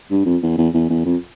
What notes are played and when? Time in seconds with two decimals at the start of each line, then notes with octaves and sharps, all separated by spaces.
0.11 G2
0.26 F2
0.42 E2
0.58 E2
0.74 E2
0.90 E2
1.05 F2